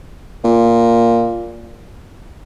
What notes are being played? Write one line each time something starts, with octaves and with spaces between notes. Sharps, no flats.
A#2